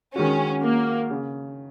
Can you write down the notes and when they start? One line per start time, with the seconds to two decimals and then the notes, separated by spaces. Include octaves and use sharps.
0.16 D#3 G#3 C#4 F#4
0.63 A#3
1.10 C#3